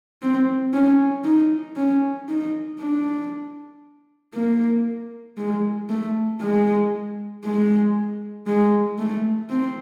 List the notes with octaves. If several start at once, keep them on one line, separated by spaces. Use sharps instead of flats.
C4
C#4
D#4
C#4
D#4
D4
A#3
G#3
A3
G#3
G#3
G#3
A3
C4